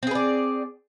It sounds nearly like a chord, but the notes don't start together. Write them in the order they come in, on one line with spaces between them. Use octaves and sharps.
C4 G#4 B4 D5